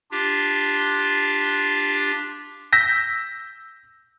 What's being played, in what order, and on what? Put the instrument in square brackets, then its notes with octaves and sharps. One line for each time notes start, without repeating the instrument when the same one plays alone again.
[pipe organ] D4 F4 G4
[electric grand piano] E6 G6 A#6 B6